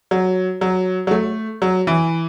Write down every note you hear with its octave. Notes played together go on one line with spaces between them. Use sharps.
F#3
F#3
F#3
A3
F#3
E3